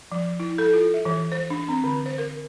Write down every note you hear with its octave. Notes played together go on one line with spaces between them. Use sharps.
F3
E4
A4
F4
E5
E3
C5
D4
C4
D3
C5
A#4